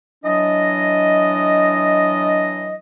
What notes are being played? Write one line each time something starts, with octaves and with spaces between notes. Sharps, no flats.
E3 F#3 D4 D#5